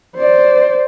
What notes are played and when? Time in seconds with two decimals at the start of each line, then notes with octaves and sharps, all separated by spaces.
0.17 C5 D5